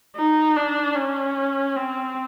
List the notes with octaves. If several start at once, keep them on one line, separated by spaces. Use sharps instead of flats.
D#4
D4
C#4
C4